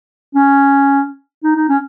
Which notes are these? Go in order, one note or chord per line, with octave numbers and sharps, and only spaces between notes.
C#4
D#4
D#4
C#4